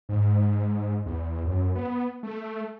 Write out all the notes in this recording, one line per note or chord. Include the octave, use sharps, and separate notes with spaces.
G#2
E2
F#2
B3
A3